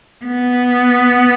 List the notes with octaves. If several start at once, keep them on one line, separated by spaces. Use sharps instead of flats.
B3